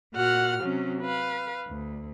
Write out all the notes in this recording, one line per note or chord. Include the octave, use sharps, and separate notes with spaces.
A#2 F#4 F#5 F6
C3 F#3 C#4
B4 F5
D2